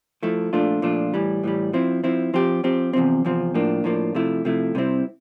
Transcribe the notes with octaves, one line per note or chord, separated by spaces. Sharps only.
F3 A3 E4
A#2 F3 A3 D4 F4
A#2 F3 A3 D4 F4
A2 E3 G3
A2 E3 G3
F3 C4 E4
F3 C4 E4
F3 C4 G4
F3 C4 G4
E2 C3 F3 C4
E2 C3 F3 C4
A2 F3 A#3 D4
A2 F3 A#3 D4
C3 F3 A3 E4
C3 F3 A3 E4
C3 G3 C4 E4